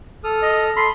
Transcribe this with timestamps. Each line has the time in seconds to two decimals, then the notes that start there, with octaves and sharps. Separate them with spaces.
0.24 A4 D#6 F6
0.42 D#5
0.77 A4 B5 C6